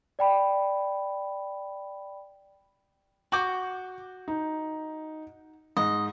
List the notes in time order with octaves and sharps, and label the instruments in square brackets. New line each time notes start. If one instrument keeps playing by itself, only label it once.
[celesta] D5 G5 B5
[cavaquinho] F#4 D6 [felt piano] C#6 G6
[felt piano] D#4
[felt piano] G#2 [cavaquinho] D#5